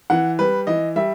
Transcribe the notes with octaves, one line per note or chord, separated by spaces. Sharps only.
E3 F#5
G3 B4
E3 D#5
G3 E5